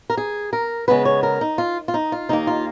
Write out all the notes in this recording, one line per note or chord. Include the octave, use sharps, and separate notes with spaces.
A#4
G#4
A#4
C#3 G#3 B3 B4
C#5
A#4
D#4
F4
F4
D#4
F4
D#2 D#3 A#3 D#4
F4